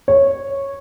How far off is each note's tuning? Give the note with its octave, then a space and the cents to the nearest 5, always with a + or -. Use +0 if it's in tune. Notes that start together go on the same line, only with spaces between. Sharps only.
C#5 -10